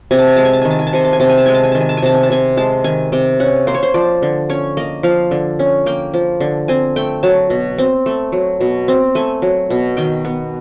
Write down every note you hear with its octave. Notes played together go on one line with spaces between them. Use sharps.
C3 G#5
A5
G#5
G#3 A5
G#5
A5
D#3 G#5
A5
G#5
A5
C3 G#5
A5
G#5
C3 A5
G#5
A5
G#3 G#5
A5
G#5
D#3 A5
G#5
A5
G#5
C3 A5
G#5
A5
C3 G#5
G#3 A5
D#3 G#5
C3 G5
C#4 F#5
A#3 C5
C#5
C5
F3 D5
D3
C#4 C#5
A#3 D#5
F3 F5
D3
C#4
A#3 G5
F3
D3
C4 G#5
A3 G5
F#3 A5
B2
C4
A3
F#3
B2
C4
A3 G#5
F#3
B2
D#3 G5
B3